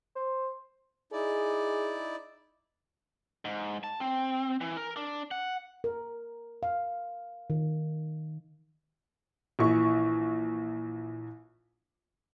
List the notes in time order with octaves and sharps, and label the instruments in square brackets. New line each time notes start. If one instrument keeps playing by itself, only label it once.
[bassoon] C5
[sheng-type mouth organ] D#4 E4 D5 [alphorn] G#4
[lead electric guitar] G#2
A5
C4
E3
A#4
D4
F#5
[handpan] A#4
F5
D#3
[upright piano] A#1 E3 C#6